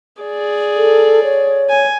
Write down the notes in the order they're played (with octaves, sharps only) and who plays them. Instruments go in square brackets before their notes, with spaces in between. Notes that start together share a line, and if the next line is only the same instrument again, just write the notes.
[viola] G#4 D5
[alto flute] A4
C#5
[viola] G#5